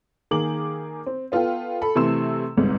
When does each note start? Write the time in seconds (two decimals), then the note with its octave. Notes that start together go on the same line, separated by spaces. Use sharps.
0.31 D#3 A#3 G#4 D6 F#7
1.06 C4
1.32 B3 F4 A4 F5 G5
1.82 A4 B5
1.95 C3 E3 A3 C6 E6 E7
2.57 G1 C2 G#2